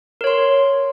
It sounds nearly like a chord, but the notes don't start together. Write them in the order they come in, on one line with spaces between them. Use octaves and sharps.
A#4 C#5 C6